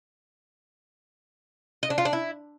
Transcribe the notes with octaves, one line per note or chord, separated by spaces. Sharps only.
D#5
D4
F4
D4
E4